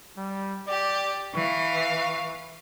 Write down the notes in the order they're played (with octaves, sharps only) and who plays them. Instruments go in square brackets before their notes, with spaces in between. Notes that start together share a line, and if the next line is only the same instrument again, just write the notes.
[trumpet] G3
[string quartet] G4 [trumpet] D5
[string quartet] E3 F5 [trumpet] C#6